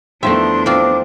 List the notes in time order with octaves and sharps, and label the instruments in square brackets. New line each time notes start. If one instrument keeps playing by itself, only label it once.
[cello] E2 D4 [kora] D#3 F3 A3 [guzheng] E5 [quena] C6
[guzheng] C4 F4 [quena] D6